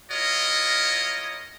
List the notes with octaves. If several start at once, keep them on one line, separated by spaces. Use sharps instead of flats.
E4 F4 A#4 C#5 D#5